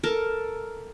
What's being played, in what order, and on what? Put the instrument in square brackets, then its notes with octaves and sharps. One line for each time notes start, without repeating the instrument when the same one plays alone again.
[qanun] A4 A#4 A5